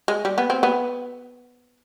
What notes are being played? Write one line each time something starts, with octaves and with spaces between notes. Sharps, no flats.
G#3
G3
B3
C4
B3